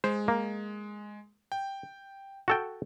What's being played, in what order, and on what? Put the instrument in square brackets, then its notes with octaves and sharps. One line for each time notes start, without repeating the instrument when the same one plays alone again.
[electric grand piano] G#3 [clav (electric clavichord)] C5
[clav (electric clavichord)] A#3
[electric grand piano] G5
[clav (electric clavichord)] F#4 A4 G5